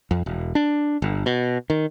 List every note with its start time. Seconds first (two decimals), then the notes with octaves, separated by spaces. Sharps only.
0.11 F2
0.26 E1
0.55 D4
1.02 G1
1.26 B2
1.70 D#3